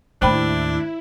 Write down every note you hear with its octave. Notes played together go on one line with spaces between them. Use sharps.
D#2 A2 D4 E4 C5 G5 B5